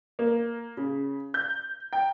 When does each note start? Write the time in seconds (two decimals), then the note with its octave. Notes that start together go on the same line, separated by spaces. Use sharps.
0.19 A#3
0.77 C#3
1.34 G6
1.93 G5